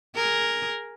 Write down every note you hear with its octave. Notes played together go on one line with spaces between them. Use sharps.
G#4 A#4